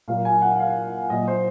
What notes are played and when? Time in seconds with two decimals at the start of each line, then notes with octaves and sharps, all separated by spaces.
0.08 A#2 F#3 A#3 F5
0.25 G#5
0.42 F#5
0.59 F5
1.10 A#2 F#3 A#3 D#5
1.28 C5